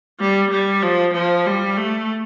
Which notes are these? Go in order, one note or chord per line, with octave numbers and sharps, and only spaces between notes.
G3
G3
F3
F3
G3
A3